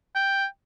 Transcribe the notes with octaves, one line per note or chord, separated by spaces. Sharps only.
G5